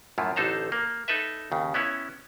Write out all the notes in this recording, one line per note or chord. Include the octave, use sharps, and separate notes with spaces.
F#2 A2 F3 E4 F4
A1 D3 D#4 A4 C5 A#5
A#3
D#4 A4 B4 E5
D#2 C#3
B3 C#4 E4 C#5